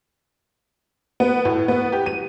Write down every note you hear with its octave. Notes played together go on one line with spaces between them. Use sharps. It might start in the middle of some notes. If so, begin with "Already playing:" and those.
B3
A2
B3
G4
D#7